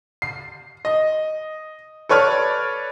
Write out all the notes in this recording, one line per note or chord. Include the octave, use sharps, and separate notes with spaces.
C7
D#5
A4 B4 C#5 D5 F6